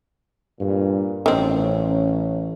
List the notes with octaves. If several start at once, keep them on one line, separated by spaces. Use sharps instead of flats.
G2 A#2
A1 D#3 C4 C#4